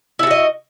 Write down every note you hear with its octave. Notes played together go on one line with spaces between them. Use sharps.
E4 F#4 A4 D#5